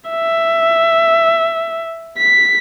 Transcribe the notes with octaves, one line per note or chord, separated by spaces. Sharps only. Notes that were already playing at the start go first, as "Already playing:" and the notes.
E5
B6